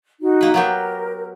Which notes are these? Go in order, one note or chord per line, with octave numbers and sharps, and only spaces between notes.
D#4 F#4
A#3 B4
F#3 B3 G4 A#4